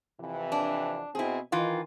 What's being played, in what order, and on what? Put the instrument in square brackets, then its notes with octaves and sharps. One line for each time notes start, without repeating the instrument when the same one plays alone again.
[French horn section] F2 C3 E3
[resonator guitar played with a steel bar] D4
[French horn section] B2 C4 [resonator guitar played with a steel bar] E4 G#4
[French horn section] D#3 [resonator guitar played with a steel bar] E3 F4